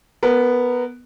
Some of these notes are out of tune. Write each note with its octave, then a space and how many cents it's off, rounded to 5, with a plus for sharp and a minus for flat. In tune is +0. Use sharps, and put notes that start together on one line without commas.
B3 +0 A#4 -15